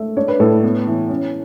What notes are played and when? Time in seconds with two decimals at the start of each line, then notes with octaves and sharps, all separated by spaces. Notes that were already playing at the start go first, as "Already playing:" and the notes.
Already playing: A3
0.17 D4 C#5
0.28 B4
0.40 A2 A4
0.63 B3
0.87 E3
1.10 C#4